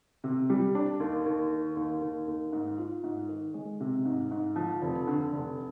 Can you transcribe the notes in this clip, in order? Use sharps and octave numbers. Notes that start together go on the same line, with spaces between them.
C3
G3
D4
D#2
D#2
D#3
D#2
D#2
D#2
G#2
F4
G#2
D#3
G#3
C3
G#2
G#2
F3
F1
D3
F1